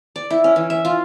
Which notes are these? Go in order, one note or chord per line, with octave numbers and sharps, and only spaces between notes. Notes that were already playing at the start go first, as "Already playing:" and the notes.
D5
E4
C#4
E3
E5
F4